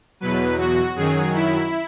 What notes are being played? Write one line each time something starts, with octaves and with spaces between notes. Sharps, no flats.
E2 B2 F#3 B4
F#4
F#2 D#3 F#3 G#4
E4